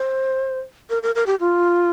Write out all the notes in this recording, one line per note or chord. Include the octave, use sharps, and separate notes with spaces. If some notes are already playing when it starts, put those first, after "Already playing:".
Already playing: C5
A#4
A#4
A#4
G4
F4